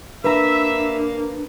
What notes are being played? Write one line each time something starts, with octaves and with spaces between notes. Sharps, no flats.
A#3 D4 B4 E5 A#5